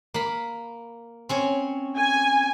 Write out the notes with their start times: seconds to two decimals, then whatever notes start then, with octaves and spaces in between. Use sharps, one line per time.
0.14 A#3 B5
1.29 C4 C#4 C#5
1.98 G#5